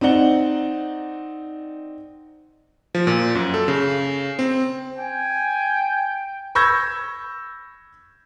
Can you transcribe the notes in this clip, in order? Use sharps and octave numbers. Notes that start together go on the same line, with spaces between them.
C4 D#4 D5 F#5 G7
F3
A#2
F#2
A4
C#3
C4
G5 G#5
B5 C#6 E6 G6 G#6 A#6